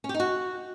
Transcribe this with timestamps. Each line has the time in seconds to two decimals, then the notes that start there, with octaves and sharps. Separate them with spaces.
0.04 C#4
0.09 G4
0.14 D#4
0.20 F#4